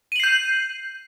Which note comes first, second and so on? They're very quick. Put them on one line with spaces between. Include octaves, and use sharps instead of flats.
D#7 F#7 C7 G6